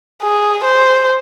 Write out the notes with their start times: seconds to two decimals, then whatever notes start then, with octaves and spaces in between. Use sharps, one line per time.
0.23 G#4
0.65 C5